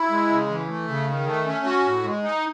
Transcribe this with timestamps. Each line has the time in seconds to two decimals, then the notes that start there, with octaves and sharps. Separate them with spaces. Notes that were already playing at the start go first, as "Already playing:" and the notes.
Already playing: E4
0.10 G#3
0.29 C#3
0.48 E3
0.68 A3
0.88 C#3
1.07 D#3
1.26 A3
1.46 C#4
1.65 F#4
1.85 A2
2.04 G#3
2.23 D#4